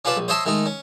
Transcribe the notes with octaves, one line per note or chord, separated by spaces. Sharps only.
C#4 F4 B4 D5 A5
A#1
C5 C#5 D#5 E5 A5 C6
D#3 G#3 A3 D#4
C#4